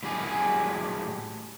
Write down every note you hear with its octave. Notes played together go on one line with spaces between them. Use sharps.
A2 F#3 G4 G#4 G#5